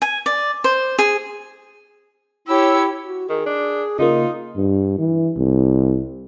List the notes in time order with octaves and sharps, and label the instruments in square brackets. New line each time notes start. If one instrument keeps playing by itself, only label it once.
[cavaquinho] G#5
D5
C5
G#4
[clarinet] E4 [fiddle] G4 [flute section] C#5 E6
[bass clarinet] F#4
[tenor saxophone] D#3 [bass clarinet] G#4
[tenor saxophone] D4
[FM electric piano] C#3 A#3 [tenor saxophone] D#4 [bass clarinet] F4
[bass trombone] G2
E3
C2